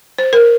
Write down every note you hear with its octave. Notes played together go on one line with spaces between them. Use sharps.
C5
A#4